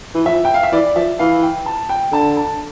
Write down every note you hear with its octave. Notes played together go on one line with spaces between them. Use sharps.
E3
F3 E5
G5
F5
E5
E3 D5
F3 E5
E3 F5
G5
A5
G5
D3 A5
A5